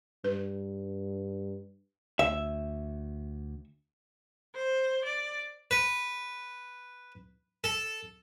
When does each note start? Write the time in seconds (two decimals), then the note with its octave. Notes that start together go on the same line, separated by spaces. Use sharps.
0.24 G2 B4
2.19 D2 E5
4.55 C5
5.05 D5
5.71 B4
7.64 A4